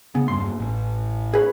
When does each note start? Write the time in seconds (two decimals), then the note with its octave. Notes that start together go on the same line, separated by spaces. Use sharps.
0.15 C#3 B3
0.28 E2 G2 A#3 C6
0.59 A1
1.34 G#4 B4 C#5